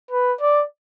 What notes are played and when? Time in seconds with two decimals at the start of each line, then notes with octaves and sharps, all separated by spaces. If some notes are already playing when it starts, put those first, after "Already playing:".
0.11 B4
0.41 D5